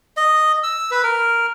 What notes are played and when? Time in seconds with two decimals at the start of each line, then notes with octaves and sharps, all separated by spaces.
0.17 D#5
0.63 E6
0.91 B4
1.03 A#4